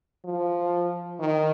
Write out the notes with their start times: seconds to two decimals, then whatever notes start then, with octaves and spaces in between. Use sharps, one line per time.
0.25 F3
1.19 D#3